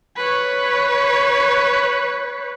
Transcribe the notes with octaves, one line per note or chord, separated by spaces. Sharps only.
B4 C#5